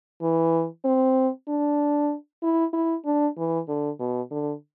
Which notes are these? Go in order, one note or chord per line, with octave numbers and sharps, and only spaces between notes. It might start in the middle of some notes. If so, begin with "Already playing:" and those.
E3
C4
D4
E4
E4
D4
E3
D3
B2
D3